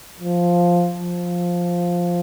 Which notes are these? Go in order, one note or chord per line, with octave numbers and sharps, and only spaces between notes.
F3
F3